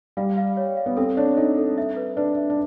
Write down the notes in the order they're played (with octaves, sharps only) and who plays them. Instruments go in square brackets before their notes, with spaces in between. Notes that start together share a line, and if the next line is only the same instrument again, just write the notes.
[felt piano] G3 [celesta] F5
[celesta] F5
C#5
F5
[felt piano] B3
[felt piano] C4 [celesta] A4
[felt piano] D4 [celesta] C#5
[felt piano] D#4 [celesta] A4
[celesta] A4
E5
B4
[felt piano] D4 [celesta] B4
[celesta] E5
[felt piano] D4